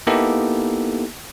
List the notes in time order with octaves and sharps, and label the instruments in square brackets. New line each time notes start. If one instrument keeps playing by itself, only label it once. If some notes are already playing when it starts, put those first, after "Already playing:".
[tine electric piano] A#3 B3 D#4 E4 G4 A4